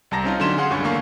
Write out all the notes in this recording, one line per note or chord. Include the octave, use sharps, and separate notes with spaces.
C2 G3 A5 A#5 A#6
C4 C#4 D#4 F4
D3 F#3 C#4 C6 E7
G#4 F5 F#5 C6
C#2 G2 C#4 C#6
E2 D3 A#3 F5 C#6